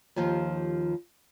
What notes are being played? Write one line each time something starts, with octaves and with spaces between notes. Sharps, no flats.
D#2 D#3 F3 F4 G4